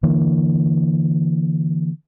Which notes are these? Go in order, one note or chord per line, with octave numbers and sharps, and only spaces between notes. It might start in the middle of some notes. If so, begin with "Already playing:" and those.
D3 E3 A#3